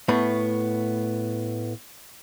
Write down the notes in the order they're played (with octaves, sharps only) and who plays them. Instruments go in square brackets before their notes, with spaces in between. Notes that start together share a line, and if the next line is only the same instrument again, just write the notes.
[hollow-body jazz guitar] A2 A3 B3 B5